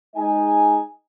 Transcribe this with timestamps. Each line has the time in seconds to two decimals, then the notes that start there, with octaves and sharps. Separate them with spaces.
0.15 G#3 D#4 D#5 G#5